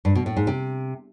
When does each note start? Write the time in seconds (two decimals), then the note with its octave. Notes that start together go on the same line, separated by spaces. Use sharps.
0.05 G2
0.15 B2
0.26 A2
0.37 G#2
0.47 C3